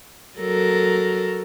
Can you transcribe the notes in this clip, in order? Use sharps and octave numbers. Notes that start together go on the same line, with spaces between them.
F#3 A4 A#4